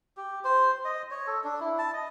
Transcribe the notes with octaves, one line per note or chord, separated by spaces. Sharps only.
G4
C5
D#5
C#5
A4
D4
E4
A5
D#5